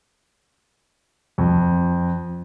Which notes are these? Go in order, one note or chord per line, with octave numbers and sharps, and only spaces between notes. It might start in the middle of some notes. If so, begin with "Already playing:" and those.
F2